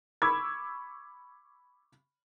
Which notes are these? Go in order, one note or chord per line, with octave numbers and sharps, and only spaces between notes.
B5 C#6 D6 E6 G#6